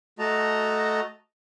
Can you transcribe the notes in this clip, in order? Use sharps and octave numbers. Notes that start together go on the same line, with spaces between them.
A3 F#4 D#5 A5 A#5